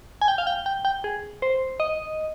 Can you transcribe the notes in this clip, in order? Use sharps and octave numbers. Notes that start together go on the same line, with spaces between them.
G#5
G5
F5
G5
G5
G5
G#4
C5
D#5